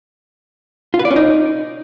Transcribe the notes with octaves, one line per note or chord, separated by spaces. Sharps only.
F4
B4
D5
C#4
D#4